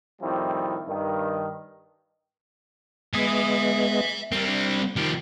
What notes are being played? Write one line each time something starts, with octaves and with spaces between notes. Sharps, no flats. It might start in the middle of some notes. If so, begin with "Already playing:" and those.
A2 D#3 F3 G3 C4 E4
G2 D#3
G#3 B3 D#5 E5 G#5
G3 C4 A#4
D4
D#3 F3 G4 F6 G6